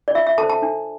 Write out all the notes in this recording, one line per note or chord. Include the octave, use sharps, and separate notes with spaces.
D5
F4 E5
E5
A4 A5
C5
A5
D4